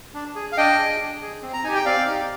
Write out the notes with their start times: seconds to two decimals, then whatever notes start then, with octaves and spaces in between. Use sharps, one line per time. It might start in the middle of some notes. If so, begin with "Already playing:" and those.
0.14 D4
0.35 G#4
0.52 F5
0.57 D4 D#5 G5
0.78 G#4
1.00 D4
1.22 G#4
1.42 C4
1.53 A#5
1.64 D#4 G4 G#5
1.74 G5
1.86 C4 D5 F5
2.07 D#4 G4